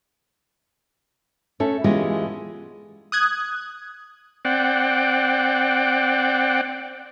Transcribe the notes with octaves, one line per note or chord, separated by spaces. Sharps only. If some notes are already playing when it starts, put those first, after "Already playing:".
A3 C#4 A4
E3 G#3 B3 C#4 F4 G4
D#6 F#6 G#6
C4 D5 F#5 G5